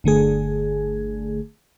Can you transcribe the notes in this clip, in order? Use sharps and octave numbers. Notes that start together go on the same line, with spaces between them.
G1 D3 A3 G#4